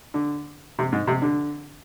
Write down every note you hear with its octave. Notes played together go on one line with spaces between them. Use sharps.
D3
C3
G#2
C3
D3